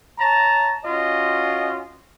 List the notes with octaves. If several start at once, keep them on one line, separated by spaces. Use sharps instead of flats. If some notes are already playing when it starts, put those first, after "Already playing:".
C#5 A5 A#5
C#4 F4 F#4 D#5